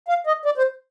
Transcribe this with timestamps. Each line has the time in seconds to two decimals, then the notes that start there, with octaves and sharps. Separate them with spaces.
0.08 F5
0.27 D#5
0.45 D5
0.58 C5